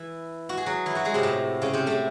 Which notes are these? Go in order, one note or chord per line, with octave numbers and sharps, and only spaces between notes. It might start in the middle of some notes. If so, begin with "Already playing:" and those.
Already playing: E3 E4
F#4
G#4
F#3 F#4
E3 E4
F#3 F#4
G#3 G#4
C3 C4
A2 A3
C#3 C#4
C3 C4
A2 A3